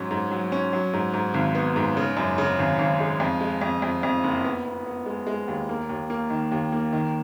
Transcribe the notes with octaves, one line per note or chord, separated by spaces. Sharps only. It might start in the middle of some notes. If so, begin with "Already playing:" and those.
Already playing: G#2 F#3 C#4
G#2
F#3
C#4
F#3
G#2
G#2
G#1
B3
G#2
C#3
F#2
C#3
G#1
G#1
G#3
F2
G#3
F2
F2
F2
F#1
B3
B3
B3
G#3
G#3
D#2
A#3
D#2
A#3
D#3
D#2
A#3
D#3